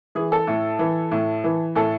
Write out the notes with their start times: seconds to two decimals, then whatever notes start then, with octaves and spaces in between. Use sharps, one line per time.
0.15 E3 G#4
0.32 A4
0.47 A2
0.79 E3
1.12 A2
1.44 E3
1.76 A2 A4